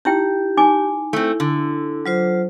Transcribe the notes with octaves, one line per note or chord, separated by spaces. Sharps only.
D#4 E4 G4 G5
D#4 G#5 D6
A3 C4 E4
D3
F#3 F4 C5